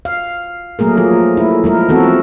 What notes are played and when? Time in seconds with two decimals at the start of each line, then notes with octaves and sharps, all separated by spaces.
0.05 F5
0.79 F#3 A3 A#3 G#4 A#4
0.97 F3 F4 G#4
1.37 A3 E4
1.64 F3 G#3 A#4
1.89 E3 F3 B3 C4 F#4 A4